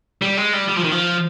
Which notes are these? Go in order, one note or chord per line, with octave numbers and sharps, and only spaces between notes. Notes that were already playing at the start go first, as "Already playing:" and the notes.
G3
G#3
G3
G3
F3
D#3
F3